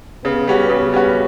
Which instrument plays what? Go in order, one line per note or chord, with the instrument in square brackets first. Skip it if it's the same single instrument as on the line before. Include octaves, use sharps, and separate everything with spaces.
[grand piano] C#3 [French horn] B3
[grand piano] G3 C#4 F#4
[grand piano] C#3 [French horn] B3
[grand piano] G3 C#4 F#4